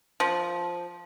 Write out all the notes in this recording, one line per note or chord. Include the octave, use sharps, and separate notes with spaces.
F3